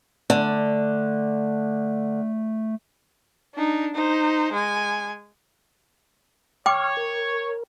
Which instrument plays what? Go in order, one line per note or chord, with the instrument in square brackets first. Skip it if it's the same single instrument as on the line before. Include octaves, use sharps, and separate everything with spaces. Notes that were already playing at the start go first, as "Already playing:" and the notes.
[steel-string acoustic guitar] D3 [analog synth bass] A3
[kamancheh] D4 D#4
D#4 C5
G#3 G#5
[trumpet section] C#5 [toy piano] G5 D6 [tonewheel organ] C#6 F6
[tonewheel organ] A#4